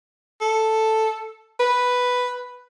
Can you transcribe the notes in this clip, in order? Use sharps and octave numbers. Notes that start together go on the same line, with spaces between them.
A4
B4